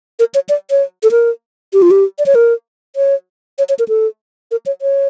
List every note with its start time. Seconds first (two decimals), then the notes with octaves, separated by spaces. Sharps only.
0.19 A#4
0.34 C#5
0.49 D5
0.71 C#5
1.03 A4
1.11 A#4
1.73 G4
1.82 F4
1.91 G4
2.19 D5
2.26 C#5
2.35 A#4
2.96 C#5
3.58 C#5
3.69 C#5
3.79 A#4
3.88 A4
4.51 A#4
4.66 C#5
4.82 C#5